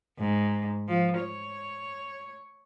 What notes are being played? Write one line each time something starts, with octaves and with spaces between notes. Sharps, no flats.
G#2
F3
C#5